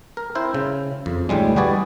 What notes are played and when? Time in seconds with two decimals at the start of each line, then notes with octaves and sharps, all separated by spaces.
0.17 A#4
0.35 C4 E4 C5
0.54 C#3
1.06 F2
1.29 D2 A2 G3 G#3
1.56 G3 F#4 G#4 B4 D5